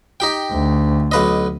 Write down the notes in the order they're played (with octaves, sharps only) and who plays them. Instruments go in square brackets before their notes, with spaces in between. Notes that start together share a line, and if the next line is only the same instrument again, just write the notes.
[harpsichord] D#4 G4 G5
[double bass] D2
[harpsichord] B1 B4 D#5